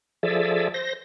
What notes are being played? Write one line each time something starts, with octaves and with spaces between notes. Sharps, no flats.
F3 G#4 A4 D5 E5
C5 A#6